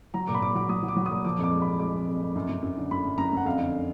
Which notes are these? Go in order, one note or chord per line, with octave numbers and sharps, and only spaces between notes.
F#3 A#5
A#2 D6
B5
A#2 D6
F#3 D6
F#3 D#6
F#3
D6
F#3
D#6
A#2
F3 D6
F2 D6
G#3
F2 B5
G#3 D6
F2
F2
F2
F#2
F#2
F#2
D3
F#2 B5
F#2
F#2 A#5
F#2 F#5
F2 F5
D3